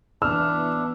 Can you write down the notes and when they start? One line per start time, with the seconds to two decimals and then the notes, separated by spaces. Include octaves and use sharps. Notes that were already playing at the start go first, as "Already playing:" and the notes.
0.22 E3 B3 D4 E6 F6